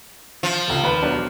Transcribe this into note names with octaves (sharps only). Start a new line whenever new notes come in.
F3
F1 C#2 F4
D#2 B4 B5
E1 F#3 D4